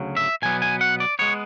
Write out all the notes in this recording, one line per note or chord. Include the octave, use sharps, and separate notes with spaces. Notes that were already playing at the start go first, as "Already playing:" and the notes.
Already playing: D2 C#3 F#3
E5
B2 F#3 B3 G#5
G#5
F#5
D5
G#3 B3 C#5